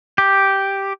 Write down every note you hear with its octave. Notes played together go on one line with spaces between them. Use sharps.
G4